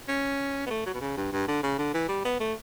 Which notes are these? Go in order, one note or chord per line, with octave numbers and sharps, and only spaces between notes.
C#4
B3
A3
F#3
B2
C#3
G2
G2
D3
C#3
D3
E3
G3
B3
A3